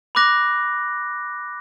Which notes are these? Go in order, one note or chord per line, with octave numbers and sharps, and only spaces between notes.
B5 D6 F#6 A#6